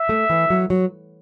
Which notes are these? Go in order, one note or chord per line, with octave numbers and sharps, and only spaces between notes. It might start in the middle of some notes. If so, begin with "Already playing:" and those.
Already playing: E5
A3
E3
F#3
F#3